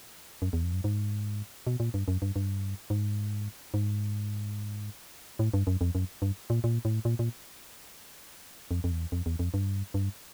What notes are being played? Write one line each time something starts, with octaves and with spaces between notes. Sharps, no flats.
F#2
E2
F2
F#2
G#2
B2
A#2
G2
F#2
G2
G2
G#2
G#2
A2
G2
F#2
F2
F#2
G2
A#2
A#2
A2
A#2
A#2
F2
F2
E2
F2
E2
F2
G2
G2